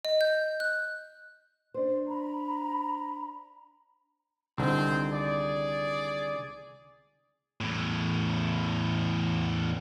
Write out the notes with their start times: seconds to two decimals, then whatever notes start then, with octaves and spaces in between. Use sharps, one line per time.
0.05 D#5
0.21 G6
0.60 F#6
1.74 D4 C5
2.08 A#5 B5
4.58 C2 D3 D#3 C4 G#4 C5
5.11 G#4 D5
7.61 E2 A2